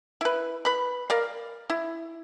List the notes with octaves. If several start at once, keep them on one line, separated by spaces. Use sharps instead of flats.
E4 B4
B4 B5
A#4 D5 F5
E4